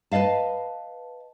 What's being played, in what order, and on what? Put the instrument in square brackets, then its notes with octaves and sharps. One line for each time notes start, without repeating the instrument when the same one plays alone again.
[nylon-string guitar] B4 D5 D#5 F5 A5